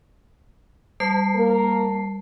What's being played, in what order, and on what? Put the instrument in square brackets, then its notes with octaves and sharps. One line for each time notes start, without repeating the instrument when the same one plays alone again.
[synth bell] G3 A5 C7
[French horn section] A#3 A#4